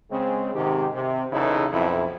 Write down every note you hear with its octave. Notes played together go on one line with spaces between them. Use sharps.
C#3 G#3 C4
G#2 C3 D#3 G4
C3
B1 E2 C#3 D#4 E4 A4
B1 F2 E4